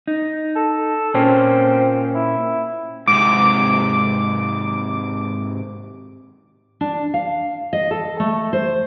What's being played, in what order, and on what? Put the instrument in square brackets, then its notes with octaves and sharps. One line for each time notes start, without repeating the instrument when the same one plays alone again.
[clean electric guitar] D#4
[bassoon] A4
[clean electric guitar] A#2 A#3 C#4 [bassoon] C4
[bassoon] E4
[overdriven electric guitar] G#2 C3 [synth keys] D6
[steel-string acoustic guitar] D4
F5
D#5
A4
A3
C5